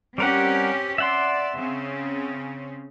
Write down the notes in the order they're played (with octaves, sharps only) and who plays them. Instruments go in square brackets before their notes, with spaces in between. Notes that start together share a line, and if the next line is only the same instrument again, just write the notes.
[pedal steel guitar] G3 A#4 F#5 [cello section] C4 C#4 G4
[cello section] D5 [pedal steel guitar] E5 F#5 C6
[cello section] C#3 C4 C#4